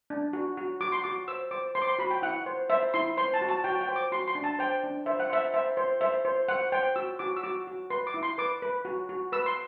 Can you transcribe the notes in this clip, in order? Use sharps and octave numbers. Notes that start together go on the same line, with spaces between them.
D4
F#4
F#4
F#4 D6
C6
F#4 D6
C5 E6
C5 D6
C5 C6
D6
C6
F#4 B5
G5
E4 F#5
C5
C5 E5
E4 C6
C5 C6
A5
F#4
A5
F#4 G5
G5
C5
D6
F#4 C6
C6
D4
A5
C5 G5
D4
C5 E5
F#5
C5 E5
C5 E5
C5
C5 E5
C5
C5 F#5
C5 G5
F#4 E6
F#4 D6
E6
F#4 D6
F#4
B4 C6
D6
E4
C6
B4 D6
B4
F#4
F#4
B4 E6
C6